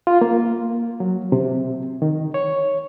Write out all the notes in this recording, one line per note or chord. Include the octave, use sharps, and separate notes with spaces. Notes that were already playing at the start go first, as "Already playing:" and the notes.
F4
A#3
F#3
C3
D#3
C#5